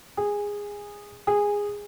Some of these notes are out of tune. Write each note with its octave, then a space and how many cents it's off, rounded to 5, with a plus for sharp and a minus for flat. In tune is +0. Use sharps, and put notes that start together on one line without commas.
G#4 -15
G#4 -15